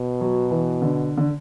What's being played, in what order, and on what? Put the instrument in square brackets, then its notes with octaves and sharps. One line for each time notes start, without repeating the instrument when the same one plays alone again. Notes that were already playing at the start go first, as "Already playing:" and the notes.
Already playing: [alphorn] B2
[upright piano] F#3
E3
D3
D3